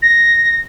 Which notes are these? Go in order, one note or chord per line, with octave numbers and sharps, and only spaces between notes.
A#6